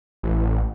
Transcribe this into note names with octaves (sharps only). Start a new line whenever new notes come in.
A1